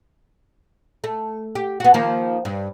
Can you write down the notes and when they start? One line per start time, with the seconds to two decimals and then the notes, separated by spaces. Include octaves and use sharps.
1.04 A3
1.55 G4
1.80 B3 F#4
1.94 D#3 F3 A#3
2.45 G2